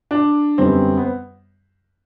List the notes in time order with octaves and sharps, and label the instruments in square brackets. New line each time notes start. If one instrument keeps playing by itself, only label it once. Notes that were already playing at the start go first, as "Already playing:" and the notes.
[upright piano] D4
[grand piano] F#2 D3 G3 B3 [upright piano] C4
[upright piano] B3